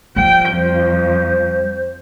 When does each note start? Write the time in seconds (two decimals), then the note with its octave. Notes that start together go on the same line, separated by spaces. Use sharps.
0.16 F3 G3 G5
0.51 F2 C5